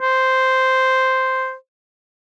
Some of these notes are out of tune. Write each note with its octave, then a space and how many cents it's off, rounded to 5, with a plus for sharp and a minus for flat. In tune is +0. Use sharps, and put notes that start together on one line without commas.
C5 -5